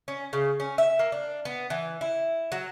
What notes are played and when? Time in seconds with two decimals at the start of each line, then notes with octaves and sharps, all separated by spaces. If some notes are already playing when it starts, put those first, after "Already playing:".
0.08 C#4
0.33 C#3
0.60 C#4
0.78 E5
0.99 A#3
1.12 D4
1.45 B3
1.70 E3
2.01 E4
2.52 F#3